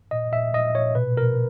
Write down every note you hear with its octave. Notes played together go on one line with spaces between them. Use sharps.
A#2 D#5
A#2 E5
A#2 D#5
A#2 C#5
B2 B4
B2 A#4